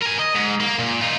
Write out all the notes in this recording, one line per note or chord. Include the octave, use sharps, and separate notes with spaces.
A#4 G#5
D#5
G#2
A#3
A#2
D#4 F4